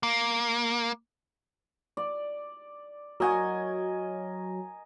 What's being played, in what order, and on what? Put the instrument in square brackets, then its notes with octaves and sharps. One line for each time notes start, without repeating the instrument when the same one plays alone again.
[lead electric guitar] A#3
[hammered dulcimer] D5
[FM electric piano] F#3 F#4 C#5 [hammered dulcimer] A#4 D#5 G#5